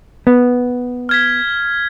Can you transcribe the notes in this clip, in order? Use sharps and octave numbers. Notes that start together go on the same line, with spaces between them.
B3
F6 G#6 B6